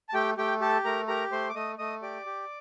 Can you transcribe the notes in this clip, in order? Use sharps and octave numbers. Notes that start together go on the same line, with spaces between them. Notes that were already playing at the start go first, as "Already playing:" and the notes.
A5
A3 G4 G5
A3 G4 G5
G4 A4 A5
A3 A#4 A#5
G4 A#4 A#5
A3 C5 C6
D6
A3 D#5 D#6
A3 D#5 D#6
G4 D5 D6
G4